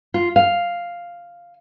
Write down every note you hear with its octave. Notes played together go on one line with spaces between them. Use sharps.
F4
F5